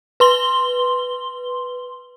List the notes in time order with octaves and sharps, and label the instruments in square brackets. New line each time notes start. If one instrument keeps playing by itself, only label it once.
[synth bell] B4 C6 G7